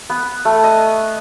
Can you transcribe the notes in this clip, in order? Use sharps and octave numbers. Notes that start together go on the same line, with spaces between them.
B3
A3
D#5